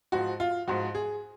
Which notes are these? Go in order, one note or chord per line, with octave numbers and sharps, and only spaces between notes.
G#2 F3 F#4
F4
G#2 F3 F#4
G#4